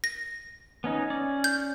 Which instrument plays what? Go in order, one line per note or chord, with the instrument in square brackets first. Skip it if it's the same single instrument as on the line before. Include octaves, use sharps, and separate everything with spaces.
[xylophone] A#6
[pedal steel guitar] B3 C#4 D#4
C#4 D5
[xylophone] G6